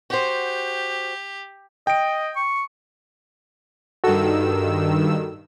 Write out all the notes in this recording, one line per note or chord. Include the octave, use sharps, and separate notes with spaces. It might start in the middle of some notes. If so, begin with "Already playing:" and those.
F#4 G4 C5
D#5 G5 D7
C#6
G2 D#3 F#4 A4 E6